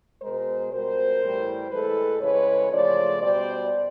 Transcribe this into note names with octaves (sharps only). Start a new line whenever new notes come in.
B2 G#3 A#4 C5
B2 G3 A#4 C5
A2 E3 G3
A2 E3 G#3 A4 B4
C#3 E3 G#3 B4 C#5
C#3 F3 A3 C5 D5
B2 G3 C5 D5